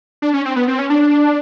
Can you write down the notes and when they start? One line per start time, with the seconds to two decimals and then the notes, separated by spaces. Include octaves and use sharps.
0.22 D4
0.34 C#4
0.45 C4
0.56 B3
0.68 C4
0.79 C#4
0.90 D4